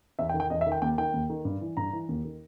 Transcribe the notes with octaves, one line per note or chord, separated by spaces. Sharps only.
E2 E5
G5
D#3
G5
E2 D#5
E5
D#3
G5
D#2 G5
D#3 G5
D#2
D#3
G2
E3
G2 A#5
E3
D#2
D#3